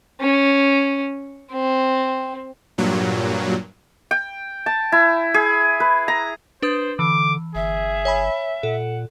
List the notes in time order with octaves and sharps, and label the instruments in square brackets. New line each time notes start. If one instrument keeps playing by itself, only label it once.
[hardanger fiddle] C#4
C4
[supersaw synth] G2 A#2 F#3
[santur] G5
A5
E4
G#4
B4
A#5
[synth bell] D4 B4 D#6 [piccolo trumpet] C5
[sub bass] D3 [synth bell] E3 [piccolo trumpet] D6
[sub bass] G1 [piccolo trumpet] G#4 [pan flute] E5
[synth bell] C#5 G#5 B5
[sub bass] A#2 [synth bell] A4 [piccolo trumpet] F#5